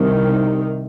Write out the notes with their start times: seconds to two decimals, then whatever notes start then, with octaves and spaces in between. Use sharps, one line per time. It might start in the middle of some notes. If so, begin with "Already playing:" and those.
Already playing: C2 C3 D#3